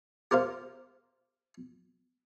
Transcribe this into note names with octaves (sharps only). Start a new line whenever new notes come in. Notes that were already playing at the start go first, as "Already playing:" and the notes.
G4 A#4 C5 F5